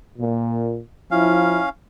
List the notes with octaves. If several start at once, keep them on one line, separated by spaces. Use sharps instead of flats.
A#2
F3 C#4 E4 F5